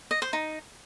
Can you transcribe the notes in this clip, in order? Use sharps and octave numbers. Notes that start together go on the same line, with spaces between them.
D#5
C5
D#4